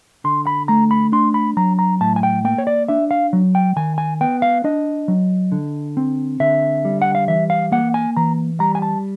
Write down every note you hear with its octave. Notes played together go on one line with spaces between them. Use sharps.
D3 C6
B5
A3 A#5
B5
D4 C6
B5
F#3 A#5
A#5
A2 A5
G#5
G5
A#3 G5
C#5
D5
D4 E5
F5
F#3
G5
D#3 G#5
G#5
B3 G5
F5
D4 D#5
F#3
D3
C4
D3 E5
G3
F#5
F5
E3 E5
F5
A#3 F#5
G#5
E3 A#5
G3 A#5
G#5
A5